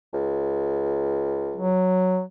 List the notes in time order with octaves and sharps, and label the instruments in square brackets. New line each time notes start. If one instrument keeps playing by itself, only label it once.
[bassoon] C#2
[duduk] F#3